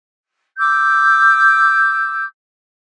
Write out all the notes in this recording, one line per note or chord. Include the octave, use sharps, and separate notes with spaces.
D6 E6 G6